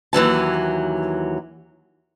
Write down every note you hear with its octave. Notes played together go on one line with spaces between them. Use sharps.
D#2 E3 F#3 A5